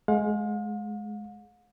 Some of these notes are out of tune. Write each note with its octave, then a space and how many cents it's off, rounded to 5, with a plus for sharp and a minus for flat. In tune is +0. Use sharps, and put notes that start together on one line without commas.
G#3 +20 F5 +45